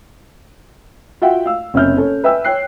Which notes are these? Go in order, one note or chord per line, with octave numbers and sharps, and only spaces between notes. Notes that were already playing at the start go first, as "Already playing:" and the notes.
F4 F#4 E5 F#5 G5
F5 E6
F#1 C3 C#4 E5 F6 G6
C#4 A4 C#5
B4 E5 G5 G#5 E6
C#5 G5 F#6 C7